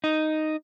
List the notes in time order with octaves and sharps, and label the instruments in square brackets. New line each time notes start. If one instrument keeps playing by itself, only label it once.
[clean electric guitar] D#4